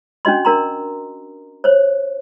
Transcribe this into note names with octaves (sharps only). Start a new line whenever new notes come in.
C#4 D4 F#4 D#5 C6
D4 A#4 A#5 C6
C5 C#5